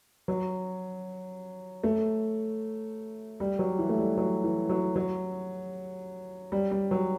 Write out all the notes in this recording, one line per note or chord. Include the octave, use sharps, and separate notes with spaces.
F#3
A3
G3
F#3
E3
A3
G3
F#3
E3
F#3
F#3
G3
G3
F#3